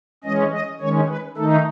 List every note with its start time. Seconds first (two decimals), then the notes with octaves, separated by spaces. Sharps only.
0.24 E3 G#3 C#4 D#5
0.52 D#5
0.80 D#3 G#3 C#4 C#5
1.08 B4
1.37 D#3 A3 D#4 A4